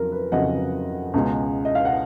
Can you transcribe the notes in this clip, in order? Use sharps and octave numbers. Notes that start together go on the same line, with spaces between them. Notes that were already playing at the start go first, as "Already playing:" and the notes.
Already playing: F2 C#3 F#3 A#4
B4
F2 C#3 F#3 D#5 F#5
C#2 B2 G#3 C#4
D#5
F5
F#5